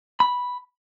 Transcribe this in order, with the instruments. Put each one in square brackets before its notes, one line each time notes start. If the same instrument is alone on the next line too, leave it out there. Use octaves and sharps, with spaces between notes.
[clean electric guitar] B5